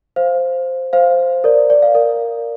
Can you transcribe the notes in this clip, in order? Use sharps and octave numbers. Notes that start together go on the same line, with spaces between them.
C5 F5
C5 F5
C5
A#4 D5
D5
F5
A#4 D5